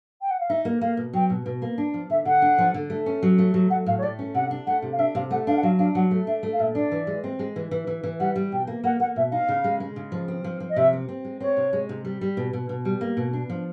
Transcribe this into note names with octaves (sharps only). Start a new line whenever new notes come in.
G5
F#5
F5
D#4 E5
A#3
A#3 F5
B2
F#3 G5
B2
B2
A#3
D4
F3
D3 E5
D3 F#5
D4
F3
D3
A3
C#4
F#3
A3
F#3
F#3 F#5
A2 F5
C#5
A3 D5
C#4
C3 F#5
D4
A3 F#5
C3
F5
D4 E5
C3 F5
A3 F#5
D4 F5
F#5
F#3 F5
D4 F5
F#3 F#5
A3
D4 E5
A3
F5
A#2 E5
D4 D5
E3
G#3
C4
G#3
E3
E3
E3
E3
G3 F#5
G3
B2 G5
A#3
A#3 F#5
A#3 F#5
B2 E5
D#4 F5
C#3
G#3
G#3
C#3
F3
C4
F3
F3
D#5
C3 E5
C4
C4
G#3
C4 C#5
C3
G#3
C3
G3
G3
B2
B2
B2
G3
A#3
B2
D4
F3